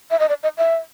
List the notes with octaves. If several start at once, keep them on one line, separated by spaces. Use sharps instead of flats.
E5
D#5
D5
D#5
E5